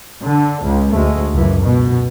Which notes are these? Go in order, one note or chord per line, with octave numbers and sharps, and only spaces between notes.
D3
C#2
D2 G#3 A3
C#2 F#2 E3
B2